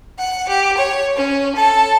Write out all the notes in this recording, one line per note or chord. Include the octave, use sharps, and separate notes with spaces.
F#5
G4
C#5
C#4
A4